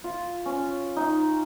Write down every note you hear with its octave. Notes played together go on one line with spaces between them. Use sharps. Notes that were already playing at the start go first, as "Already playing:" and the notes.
F4
C#4
D#4